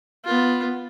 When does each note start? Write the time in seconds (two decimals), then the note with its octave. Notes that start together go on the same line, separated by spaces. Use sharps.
0.25 B3 F4